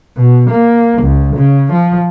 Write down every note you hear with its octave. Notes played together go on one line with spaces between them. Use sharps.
B2
A#3
C#2
C#3
F3